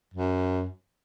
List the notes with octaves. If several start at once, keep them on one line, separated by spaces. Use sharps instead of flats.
F#2